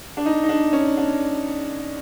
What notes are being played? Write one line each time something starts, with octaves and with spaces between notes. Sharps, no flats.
D4
D#4
D#4
D4
C#4
D4